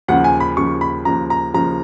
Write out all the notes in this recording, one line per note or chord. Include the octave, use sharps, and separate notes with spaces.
D#2 C#3 F3 F#5
G#5
B5
D#2 C#3 F3 C#6
B5
D#2 C#3 F3 A#5
A#5
D#2 C#3 F3 A#5